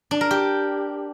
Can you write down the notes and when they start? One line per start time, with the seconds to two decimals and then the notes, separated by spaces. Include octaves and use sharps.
0.11 D4
0.21 A#4
0.31 G4